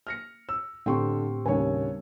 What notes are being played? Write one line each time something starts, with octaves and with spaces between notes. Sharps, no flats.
F6 A#6 C#7
E6
A2 D3 B3 C4 G4 G5 C6 C#6
D#2 C#3 G3 D4 C#5 G#5